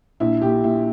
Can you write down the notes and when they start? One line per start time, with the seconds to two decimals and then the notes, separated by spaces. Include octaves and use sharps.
0.20 A#1 E4
0.42 A#2 G4
0.64 A#2 E4